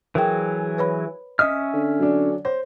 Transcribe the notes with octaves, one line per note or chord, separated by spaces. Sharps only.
E3 F#3 G#4 A#4 G5
B4 C#5 B5
C#4 D#5 E5 D#6 F6
D3
F#3 D4
C5 C#5